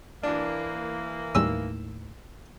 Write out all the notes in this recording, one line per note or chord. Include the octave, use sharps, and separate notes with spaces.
E3 A#3 D4
D#2 A2 D#3 G3 C#4 E6